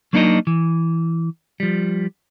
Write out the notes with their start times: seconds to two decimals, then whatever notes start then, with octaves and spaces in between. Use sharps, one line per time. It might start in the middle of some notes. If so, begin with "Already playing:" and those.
0.13 F#3 A#3 D4 D#4 A#4 D#5
0.47 E3
1.60 F3 G3